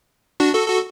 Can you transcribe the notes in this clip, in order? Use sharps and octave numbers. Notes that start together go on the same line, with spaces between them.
D4 F#4
F#4 A4
F#4 A4